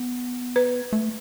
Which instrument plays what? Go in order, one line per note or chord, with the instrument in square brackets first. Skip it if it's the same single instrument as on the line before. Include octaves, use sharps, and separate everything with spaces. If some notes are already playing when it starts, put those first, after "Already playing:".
Already playing: [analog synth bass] B3
[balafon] B4
[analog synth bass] A3